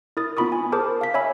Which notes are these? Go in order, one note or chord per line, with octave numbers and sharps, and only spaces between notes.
E4 A#4 D#6 A6
B3 D#4 F4 B5 C#6 D#6
G#5
G#4 A#4 C5 A5 D6
F5 B6
C#5 E5 G#5 B5 E6